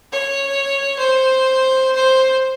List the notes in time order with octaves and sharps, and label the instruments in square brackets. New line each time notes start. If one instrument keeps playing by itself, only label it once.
[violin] C#5
C5
C5